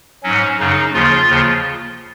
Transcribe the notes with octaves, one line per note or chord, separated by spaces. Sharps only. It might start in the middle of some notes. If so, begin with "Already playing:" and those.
G#2 F#3 C#4
F#2 C#3 F#3 D#4
D#2 C#3 F3 F4
D#2 C#3 F3